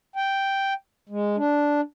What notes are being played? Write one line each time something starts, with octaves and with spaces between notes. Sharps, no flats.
G5
G#3
D4